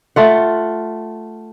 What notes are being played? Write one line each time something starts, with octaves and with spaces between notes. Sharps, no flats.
A3 F4 F#5